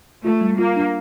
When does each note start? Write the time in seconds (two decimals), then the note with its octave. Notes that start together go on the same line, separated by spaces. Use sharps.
0.24 A3 F4
0.41 G3
0.58 A#3 F4
0.76 D4